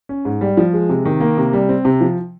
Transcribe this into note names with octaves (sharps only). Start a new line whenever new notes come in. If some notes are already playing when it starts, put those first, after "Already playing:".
C#4
G#2
G3
F3
G#3
C3
D#3
A#3
C3
G3
C4
C3
F3